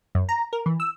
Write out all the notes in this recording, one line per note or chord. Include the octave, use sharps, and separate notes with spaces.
F#2
A#5
A#4
E3
E6